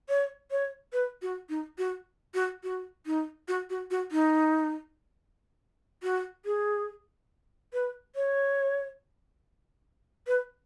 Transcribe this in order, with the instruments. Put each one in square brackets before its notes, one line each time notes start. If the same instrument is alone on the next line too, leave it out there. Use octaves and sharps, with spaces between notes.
[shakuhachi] C#5
C#5
B4
F#4
D#4
F#4
F#4
F#4
D#4
F#4
F#4
F#4
D#4
F#4
G#4
B4
C#5
B4